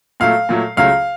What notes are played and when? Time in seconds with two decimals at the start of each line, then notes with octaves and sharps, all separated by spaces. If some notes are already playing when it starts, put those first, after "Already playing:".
0.20 A#2 F#3 A3 F5
0.49 A#2 F#3 A3
0.77 C#2 C#3 F#3 A3 F5